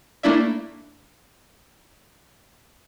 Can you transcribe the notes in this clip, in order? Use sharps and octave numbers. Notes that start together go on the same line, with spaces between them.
A3 A#3 D4 E4 D5 E5